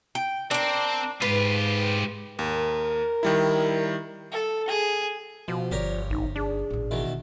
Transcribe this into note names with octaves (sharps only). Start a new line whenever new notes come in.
G5
C4 D4 A#4
G#2 F4 G4 B4
D#2 A#4
D#3 G3 E4
A4
G#4
B2 F3
G1 D3 G4 A#4 C#5 D5
A1 D#4
D4 G#4
A1 A#2
B2 D#3 E3